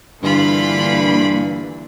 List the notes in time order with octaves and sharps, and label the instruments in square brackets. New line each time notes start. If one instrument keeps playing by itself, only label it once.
[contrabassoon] G2 [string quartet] D3 [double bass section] E3 A#3 [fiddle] F4 B5